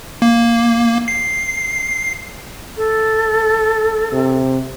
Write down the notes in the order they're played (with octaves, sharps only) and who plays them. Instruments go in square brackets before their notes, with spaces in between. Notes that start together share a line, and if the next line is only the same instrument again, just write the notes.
[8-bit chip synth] A#3
C7
[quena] A4
[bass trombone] C3